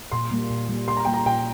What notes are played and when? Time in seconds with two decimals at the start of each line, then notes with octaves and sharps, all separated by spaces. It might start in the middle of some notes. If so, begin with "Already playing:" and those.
0.12 A#2 C6
0.31 G3 A#3
0.51 A#2
0.69 G3 A#3
0.87 A#2 C6
0.97 A#5
1.05 G3 A#3 G5
1.14 A#5
1.26 A#2 G5